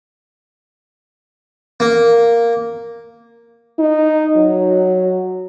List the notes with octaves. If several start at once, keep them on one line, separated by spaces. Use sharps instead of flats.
A#3
D#4
F#3